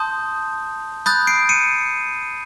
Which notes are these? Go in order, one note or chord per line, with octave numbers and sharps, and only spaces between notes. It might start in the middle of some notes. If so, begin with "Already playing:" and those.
Already playing: A5 C6 D#6 G6
B5 D#6 F#6 G6 A6
C7 D7
C#7 D#7